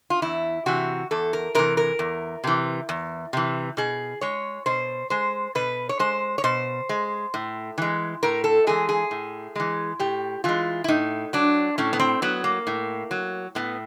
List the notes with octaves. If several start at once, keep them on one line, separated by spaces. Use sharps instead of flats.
F4
E2 E4
C3 E3 F#4
E2 A4
A#4
C3 E3 A#4
A#4
E2
C3 E3
E2
C3 E3
B2 G#4
G#3 C#5
B2 C5
G#3 C5
B2 B4
C#5
G#3 C5
C#5
B2 C5
G#3
A2
E3 G#3
A2 A#4
A4
E3 G#3 G#4
G#4
A2
E3 G#3
A2 G4
E3 G#3 F4
E4
A2 D#4
F#3 D4
A2 C#4
B3
C4
F#3 B3
A#3
A2
F#3
A2 B3